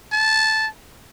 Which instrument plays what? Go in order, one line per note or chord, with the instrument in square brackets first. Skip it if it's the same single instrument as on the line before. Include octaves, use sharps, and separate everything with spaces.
[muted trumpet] A5